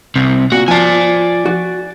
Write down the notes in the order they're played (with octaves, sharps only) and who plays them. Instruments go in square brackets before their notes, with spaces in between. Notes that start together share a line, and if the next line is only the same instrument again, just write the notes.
[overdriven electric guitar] C2 C3
[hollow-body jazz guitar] A#2 [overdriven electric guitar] F#4
[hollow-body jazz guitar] F3 A5 [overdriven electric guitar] D5 G#5
[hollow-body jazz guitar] F#4